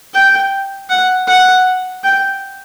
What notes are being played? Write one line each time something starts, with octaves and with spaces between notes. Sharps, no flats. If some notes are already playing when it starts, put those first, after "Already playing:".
G5
F#5
F#5
G5